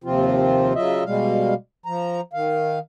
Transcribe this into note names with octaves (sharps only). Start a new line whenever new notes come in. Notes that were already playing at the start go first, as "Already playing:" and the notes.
D#2 C3 F3 C4 F4
C#3 F#3 F4 D#5 E5
B2 G3 G#3 F5
F3 A#5
D#3 F5